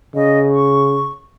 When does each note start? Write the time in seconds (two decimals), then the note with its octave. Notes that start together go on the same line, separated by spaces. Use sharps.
0.15 C#3 D#5
0.51 C#6